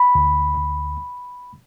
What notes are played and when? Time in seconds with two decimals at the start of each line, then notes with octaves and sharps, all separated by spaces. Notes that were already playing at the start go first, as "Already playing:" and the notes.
Already playing: B5
0.15 D2
0.57 D2